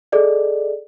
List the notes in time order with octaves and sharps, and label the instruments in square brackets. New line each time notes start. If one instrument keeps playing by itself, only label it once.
[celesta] G#4 A4 D5 D#5